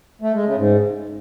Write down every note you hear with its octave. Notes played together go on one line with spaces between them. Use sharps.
A3
G#3
C#3
G#2